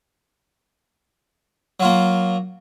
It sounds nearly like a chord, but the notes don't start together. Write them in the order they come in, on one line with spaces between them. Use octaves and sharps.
F#3 F4 A#3